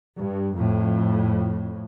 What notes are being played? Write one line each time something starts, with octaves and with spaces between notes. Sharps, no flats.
G2
F2 A2